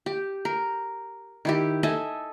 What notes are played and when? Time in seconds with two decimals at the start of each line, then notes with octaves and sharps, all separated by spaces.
0.06 G4
0.45 A#4
1.45 D#3 E4 G4
1.83 A4 D#5 E5 G#5